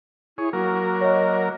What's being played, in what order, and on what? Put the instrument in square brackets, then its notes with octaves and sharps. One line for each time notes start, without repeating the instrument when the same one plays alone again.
[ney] E4 [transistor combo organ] G#4 C#5
[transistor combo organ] F#3 A#3 A#4 [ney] F#4
[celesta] C#5 D#5